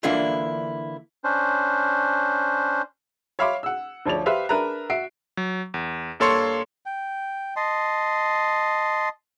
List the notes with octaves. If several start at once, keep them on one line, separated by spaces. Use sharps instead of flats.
D3 E3 A#3 D4 E4 F4
C#4 D4 C5
C#5 E5 F5 B5 C6 D6
F#5 E6
D2 F3 C#5 D5 F7
G4 B4 C5 E5 F5
D4 G#4 A#4 B4 E5 A#5
F#4 E5 C7 D7
F#3
E2
G2 A#3 A4 C#5 C6 C#6
G5
D#5 A5 C6